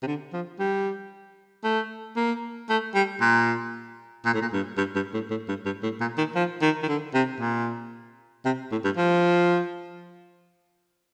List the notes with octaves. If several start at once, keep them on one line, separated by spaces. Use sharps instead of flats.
C3
D3
F3
G3
A3
A#3
A3
G3
A#2
A#2
A2
A#2
G2
G2
G2
A2
A2
G2
G2
A2
A#2
D#3
F3
D#3
D#3
D3
C3
A#2
C3
A2
G2
F3